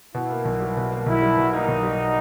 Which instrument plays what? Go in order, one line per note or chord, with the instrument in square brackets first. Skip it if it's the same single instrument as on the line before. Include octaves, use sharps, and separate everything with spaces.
[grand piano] B2 [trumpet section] E4
[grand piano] A#3
B1
G3
B2
A#3
[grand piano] B1 [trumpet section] E4
[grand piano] G3
B2
[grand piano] A#3 [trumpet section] D#4
[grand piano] B1
G3